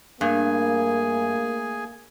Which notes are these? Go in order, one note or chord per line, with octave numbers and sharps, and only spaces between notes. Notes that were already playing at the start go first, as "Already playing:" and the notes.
G2 A3 A#3 G#4 G#5